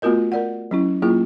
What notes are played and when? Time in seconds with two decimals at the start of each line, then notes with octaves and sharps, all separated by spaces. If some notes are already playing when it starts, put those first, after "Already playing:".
0.02 A3 B3 F4 F#4 A#4 D#5
0.32 A#4 D5 F#5
0.71 F#3 C#4 E4
1.02 F#3 A#3 E4 F4 G#4